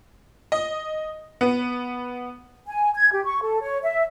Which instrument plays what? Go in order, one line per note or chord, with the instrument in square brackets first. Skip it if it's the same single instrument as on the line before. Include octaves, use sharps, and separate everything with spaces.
[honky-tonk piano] D#5
B3
[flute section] G#5
G#6
G4
C#6
A4
C#5
E5